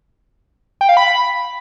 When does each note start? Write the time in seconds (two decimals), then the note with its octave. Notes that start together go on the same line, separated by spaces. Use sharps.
0.81 G5
0.89 F5
0.97 B5